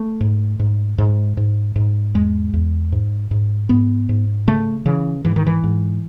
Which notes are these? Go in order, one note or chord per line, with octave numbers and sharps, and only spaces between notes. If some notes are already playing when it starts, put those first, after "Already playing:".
Already playing: A3
G#2
G#2
G#2
G#2
G#2
E2 G#3
E2
G#2
G#2
G#2 B3
G#2
C#3 A3
C#3 E3
G#2 E3
D#3
E3
G#2